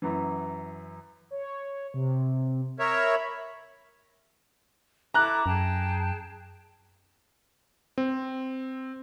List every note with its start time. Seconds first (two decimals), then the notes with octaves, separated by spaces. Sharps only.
0.02 F#2 E3
1.31 C#5
1.94 C3
2.79 A#4 C#5 E5
2.94 B5
5.14 E4 A4 A#5 D6 F#6
5.46 F#2 G#4 G5 A5
7.98 C4